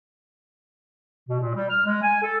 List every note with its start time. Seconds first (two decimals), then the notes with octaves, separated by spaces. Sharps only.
1.27 B2
1.40 A#2
1.54 G3
1.68 F6
1.85 G#3
2.02 G#5
2.22 A4